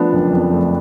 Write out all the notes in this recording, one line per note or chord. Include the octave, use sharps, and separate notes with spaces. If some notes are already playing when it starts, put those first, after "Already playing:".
Already playing: F3 A3 B3 D4
F#1
F2
A3